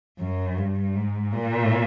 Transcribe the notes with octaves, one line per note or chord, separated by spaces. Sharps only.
F#2
G2
G#2
A#2